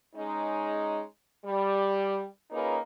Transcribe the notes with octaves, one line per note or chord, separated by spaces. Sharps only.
G#3 C#4 D#4
G3
A#3 C#4 D#4 F4 G#4 B4